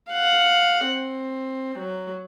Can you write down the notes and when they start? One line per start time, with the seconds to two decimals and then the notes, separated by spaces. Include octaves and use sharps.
0.11 F5 F#5
0.86 C4
1.78 F#3